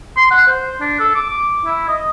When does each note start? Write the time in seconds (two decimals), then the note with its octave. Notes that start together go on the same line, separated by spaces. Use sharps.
0.17 C6
0.31 F#5
0.47 C5
0.81 D4
1.00 A4
1.15 D6
1.29 D6
1.66 E4
1.88 D#5